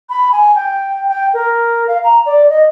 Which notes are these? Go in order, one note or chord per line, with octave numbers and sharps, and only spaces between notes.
B5
G#5
G5
G5
A#4
F5
A#5
D5
D#5